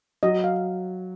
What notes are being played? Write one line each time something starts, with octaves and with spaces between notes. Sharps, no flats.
F#3 D#5
F5